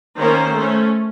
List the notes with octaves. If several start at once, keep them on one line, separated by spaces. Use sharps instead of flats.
D#3 A#3 C#4 C5
A3 C#4